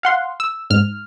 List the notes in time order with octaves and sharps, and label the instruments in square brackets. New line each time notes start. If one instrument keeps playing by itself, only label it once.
[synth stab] F5 F#5 C6
E6
G#2 F6